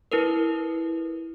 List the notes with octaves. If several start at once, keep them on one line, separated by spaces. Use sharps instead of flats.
E4 A#4 B4